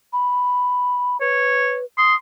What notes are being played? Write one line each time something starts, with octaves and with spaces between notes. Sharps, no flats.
B5
B4 C#5
C6 D#6